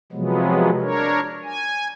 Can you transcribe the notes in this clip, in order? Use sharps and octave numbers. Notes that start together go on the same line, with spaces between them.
C3 F3 F#3 G#3 B3
D4 A#4 C#5
G#5